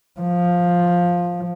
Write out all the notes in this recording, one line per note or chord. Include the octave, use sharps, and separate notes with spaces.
F3